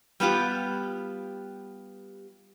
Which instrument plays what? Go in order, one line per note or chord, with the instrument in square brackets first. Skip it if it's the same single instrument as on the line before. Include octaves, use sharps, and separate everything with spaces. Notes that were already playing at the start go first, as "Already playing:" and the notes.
[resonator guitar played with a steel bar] G3 B3 F4 G4